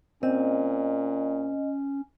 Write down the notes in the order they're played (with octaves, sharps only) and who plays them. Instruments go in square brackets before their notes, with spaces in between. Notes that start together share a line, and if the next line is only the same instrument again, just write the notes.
[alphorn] A#2 [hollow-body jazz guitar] C4 [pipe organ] C#4 [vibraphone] D#5